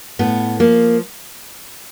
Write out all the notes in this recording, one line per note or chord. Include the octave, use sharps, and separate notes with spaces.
A2 B3
F3 A#3